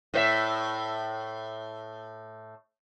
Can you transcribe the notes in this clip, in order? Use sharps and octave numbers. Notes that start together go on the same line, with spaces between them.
A2 C5 E5